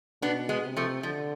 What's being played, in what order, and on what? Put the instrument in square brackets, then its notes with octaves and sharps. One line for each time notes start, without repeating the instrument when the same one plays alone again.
[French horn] B2 [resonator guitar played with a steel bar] B3 D4
[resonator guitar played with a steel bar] G#3 B3
[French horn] C3
[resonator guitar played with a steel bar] F3 A3
[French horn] D3 [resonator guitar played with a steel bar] F3